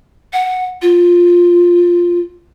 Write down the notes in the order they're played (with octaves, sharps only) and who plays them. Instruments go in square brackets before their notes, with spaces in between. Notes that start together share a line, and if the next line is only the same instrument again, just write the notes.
[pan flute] F#5
F4